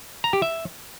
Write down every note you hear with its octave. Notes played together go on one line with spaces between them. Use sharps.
A#5
G4
E5